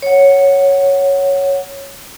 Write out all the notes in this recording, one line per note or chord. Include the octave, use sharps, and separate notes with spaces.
C#5 F#5